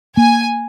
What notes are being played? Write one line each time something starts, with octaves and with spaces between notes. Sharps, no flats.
A#3 G#5